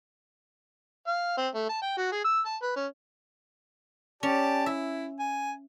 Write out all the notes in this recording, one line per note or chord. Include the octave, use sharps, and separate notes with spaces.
F5
C4
A3
A5
G5
F#4
G#4
E6
A5
B4
C#4
C#4 G4 D5 A5
E4 E5
G#5